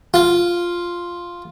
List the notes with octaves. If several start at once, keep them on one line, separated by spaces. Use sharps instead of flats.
F4